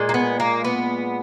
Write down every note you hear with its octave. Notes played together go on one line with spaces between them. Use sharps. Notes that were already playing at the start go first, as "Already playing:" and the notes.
Already playing: A#2 G#3
A#3
B3
A#3
B3